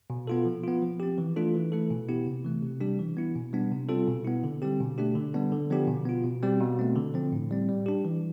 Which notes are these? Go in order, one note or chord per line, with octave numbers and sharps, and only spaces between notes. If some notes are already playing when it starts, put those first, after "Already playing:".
B2
B3 F4 A4
F3
B3 F4
F3
C4 G4
E3
A3 D4 F4 A4
E3
A3 E4 A4
B2
B3 E4 G4
C3
E3 A3
C3
G3 D4 G4
E3
B3 E4
B2
G3 B3 D4
C3
G3 C4 F4 A4
B2
B3 E4
D3
G3 C4 G4
B2
A3 D4 G4
D3
G3 B3 D4
D3
F3 B3 D4 G4
B2
B3 F4
B2
G3 C4 G4
B2
A3 C4
D3
F3 C4
A2
G3 C4
G3
D4 G4
E3